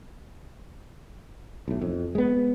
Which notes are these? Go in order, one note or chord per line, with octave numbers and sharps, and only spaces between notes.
B1 A2
F2
G#3 B3